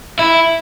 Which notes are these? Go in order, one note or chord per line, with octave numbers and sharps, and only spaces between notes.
E4